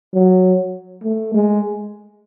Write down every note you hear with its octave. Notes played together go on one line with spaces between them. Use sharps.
F#3
A3
G#3